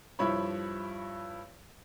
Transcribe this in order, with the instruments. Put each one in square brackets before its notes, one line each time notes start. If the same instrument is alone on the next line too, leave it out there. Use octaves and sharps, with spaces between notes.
[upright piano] G2 F3 E4 C#5 B5